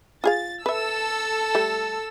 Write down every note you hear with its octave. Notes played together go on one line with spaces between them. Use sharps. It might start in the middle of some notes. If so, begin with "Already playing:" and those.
F4 G#4 F5 A6
A4 B4 E5 E6
G3 A3